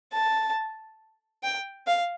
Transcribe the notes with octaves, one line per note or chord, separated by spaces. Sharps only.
A5
G5
F5